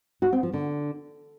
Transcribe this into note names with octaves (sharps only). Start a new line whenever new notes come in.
F#4
C4
F3
D3